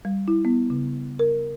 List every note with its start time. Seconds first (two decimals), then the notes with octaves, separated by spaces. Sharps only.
0.05 G3
0.28 E4
0.45 B3
0.70 C#3
1.19 A#4